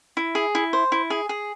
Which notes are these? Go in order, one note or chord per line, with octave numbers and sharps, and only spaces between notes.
E4
G#4
E4
C5
E4
G#4
G#4